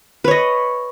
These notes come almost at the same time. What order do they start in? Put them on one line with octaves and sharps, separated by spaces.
B4 C#5 D#5